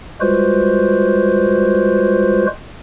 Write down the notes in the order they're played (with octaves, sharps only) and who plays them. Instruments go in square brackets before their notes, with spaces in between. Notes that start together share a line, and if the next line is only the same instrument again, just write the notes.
[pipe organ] G3 G#3 F4 F#4 B4 C5